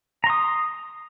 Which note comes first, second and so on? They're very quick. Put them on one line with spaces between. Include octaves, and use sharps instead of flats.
A#5 C6 D#6